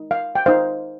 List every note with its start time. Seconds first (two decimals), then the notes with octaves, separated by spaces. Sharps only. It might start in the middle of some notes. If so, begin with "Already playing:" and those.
Already playing: D#4
0.11 F5
0.35 G5
0.46 D#4 C5 F5